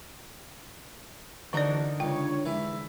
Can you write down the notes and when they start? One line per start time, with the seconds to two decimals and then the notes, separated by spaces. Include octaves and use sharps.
1.53 A1 D3 E3 D4 D#4 A#4 D5
2.00 C#2 D4 C#5 G5
2.46 E3 G#3 E5